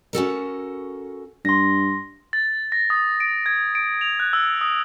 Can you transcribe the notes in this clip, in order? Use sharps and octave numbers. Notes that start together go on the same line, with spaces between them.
C#4 F#4 A4 A#4
G2 C6 A#6
A6
A#6
D#6
D7
G#6
D7
F7
F#6
E6
D#6